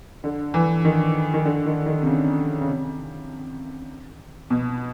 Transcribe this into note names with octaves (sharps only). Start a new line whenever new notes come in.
D3
E3
D#3
D#3
D3
D#3
D#3
C3
C#3
C#3
C3
B2